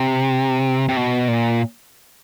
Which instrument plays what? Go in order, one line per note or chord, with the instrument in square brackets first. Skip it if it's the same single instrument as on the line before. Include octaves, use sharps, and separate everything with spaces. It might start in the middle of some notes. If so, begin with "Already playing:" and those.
Already playing: [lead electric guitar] C3
C3
B2
A#2